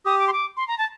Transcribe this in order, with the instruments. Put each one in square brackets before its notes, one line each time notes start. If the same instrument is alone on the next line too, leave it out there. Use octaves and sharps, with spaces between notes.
[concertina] G4 [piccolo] D#6
[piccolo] D6
C6
D6
C6
A#5
A5